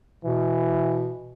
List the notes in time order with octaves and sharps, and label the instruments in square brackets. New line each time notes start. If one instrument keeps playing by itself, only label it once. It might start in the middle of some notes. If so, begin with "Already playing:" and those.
[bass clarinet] B2 [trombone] E3